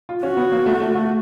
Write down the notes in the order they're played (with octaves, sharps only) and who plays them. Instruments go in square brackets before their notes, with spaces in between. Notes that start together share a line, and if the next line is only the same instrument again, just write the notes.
[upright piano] F4
[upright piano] C#4 [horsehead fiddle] F#4
[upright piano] B3
A#3
A3
A3
A3